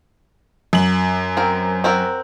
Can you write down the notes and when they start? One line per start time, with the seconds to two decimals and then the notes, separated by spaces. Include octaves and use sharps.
0.73 F#2 F#7
1.37 C4 A#4
1.84 C4 F#4 A#4